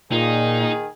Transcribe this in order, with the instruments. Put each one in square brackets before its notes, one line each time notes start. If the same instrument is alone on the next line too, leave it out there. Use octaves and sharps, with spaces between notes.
[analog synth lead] A#2 [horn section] D#3 G#4 [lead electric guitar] D#4